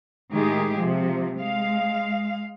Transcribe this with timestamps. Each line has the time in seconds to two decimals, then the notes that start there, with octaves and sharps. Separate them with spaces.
0.32 A2 D#3 G#3 G4 G#4
0.79 C3 F3
1.38 G#3 F5